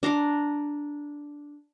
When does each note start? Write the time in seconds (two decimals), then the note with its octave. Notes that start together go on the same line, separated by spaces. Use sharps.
0.03 D4 A#5 C6 D6